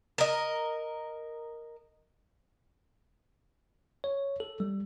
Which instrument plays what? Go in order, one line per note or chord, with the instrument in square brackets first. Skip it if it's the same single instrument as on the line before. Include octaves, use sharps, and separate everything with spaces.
[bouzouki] A#4 D#5
[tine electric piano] C#5
A4
G3